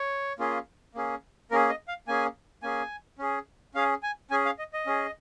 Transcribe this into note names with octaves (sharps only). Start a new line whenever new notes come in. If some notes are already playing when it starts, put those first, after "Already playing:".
Already playing: C#5
A#3 C#4 F4 G#4
A#3 C#4 G#4
A#3 C#4 G#4 A#4
D#5
F5
A#3 C#4 G#4 G#5
A#3 C#4 G#4 G#5
C#4 G#4
C#4 G#4 F5
G#5
C#4 G#4 G#5
F5
D#5
D#5
C#4 G#4